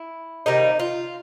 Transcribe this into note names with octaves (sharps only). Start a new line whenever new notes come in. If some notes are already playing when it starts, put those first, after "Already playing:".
Already playing: E4
C3 D#3 G3 A#3 D#4
F4